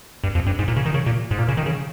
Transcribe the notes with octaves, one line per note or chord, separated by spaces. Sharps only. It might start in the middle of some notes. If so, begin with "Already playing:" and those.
G2
F2
G2
G#2
A#2
C#3
D#3
C#3
A#2
G#2
A#2
C#3
D#3
C#3